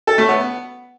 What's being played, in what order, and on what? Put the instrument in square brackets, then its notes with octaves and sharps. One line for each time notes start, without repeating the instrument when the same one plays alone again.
[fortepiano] A4
A3
B3